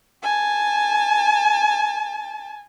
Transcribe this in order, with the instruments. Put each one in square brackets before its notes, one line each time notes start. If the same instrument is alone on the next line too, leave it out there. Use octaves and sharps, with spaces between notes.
[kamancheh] G#5 A5